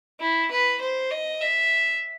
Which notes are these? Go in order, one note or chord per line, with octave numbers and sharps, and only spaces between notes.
E4
B4
C5
D#5
E5